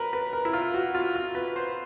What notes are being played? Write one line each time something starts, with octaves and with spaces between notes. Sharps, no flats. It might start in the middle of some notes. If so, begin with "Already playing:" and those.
Already playing: F#3 A#4 B4
B4
A#4
E4
F4
F#4
F4
F4
B4
C5